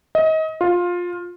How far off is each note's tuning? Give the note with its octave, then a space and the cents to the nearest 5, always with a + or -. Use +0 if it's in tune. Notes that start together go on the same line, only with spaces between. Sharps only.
D#5 +30
F4 +15